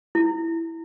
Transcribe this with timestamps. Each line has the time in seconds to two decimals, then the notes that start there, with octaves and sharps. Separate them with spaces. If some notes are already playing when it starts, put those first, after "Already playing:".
0.15 E4